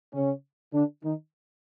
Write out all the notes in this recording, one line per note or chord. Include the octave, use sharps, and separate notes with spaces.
C#3 C#4
D3 D4
D#3 D#4